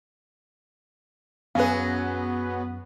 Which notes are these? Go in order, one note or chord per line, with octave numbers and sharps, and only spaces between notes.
F#2 F#3 B3 C#4 G#4 B4 F5